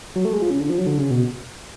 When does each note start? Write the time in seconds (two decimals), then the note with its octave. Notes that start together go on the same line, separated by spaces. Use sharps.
0.16 F#3
0.25 A3
0.33 G#3
0.42 F3
0.51 C#3
0.60 D3
0.69 F3
0.78 F#3
0.87 D3
0.98 C#3
1.11 B2